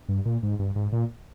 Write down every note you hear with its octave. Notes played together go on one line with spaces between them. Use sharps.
G2
A#2
G#2
G2
G#2
A#2